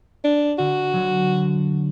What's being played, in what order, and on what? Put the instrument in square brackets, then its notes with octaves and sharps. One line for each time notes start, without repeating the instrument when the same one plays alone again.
[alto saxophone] D4
[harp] D3 [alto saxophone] F#4
[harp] D3 F#3